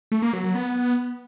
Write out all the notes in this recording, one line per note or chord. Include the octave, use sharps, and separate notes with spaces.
A3
A#3
F#3
F#3
B3